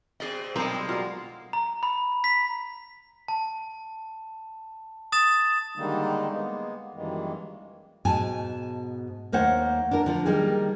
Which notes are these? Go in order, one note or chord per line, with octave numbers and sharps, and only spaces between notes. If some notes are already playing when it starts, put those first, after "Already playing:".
B2 C4 G#4 D5 D#5
B1 G3 G#3 A#3 C4 A4 A#4
F4 F#4 A#4
A#5
B5
B6
A5
D#6 A6 E7
D3 D#3 G3 G#3 A#3 D#4
G#3 A#3 B3
F#2 D#3 E3 G3 G#3 A#3
G#2 B2 G#5 A5
D#2 A#3 C5 C#5 F#5
D4 A#4
D3 F3
D#3 G3 A#3 G#4